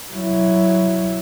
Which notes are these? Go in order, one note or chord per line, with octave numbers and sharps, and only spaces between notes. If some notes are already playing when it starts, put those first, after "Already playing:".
F#3 E4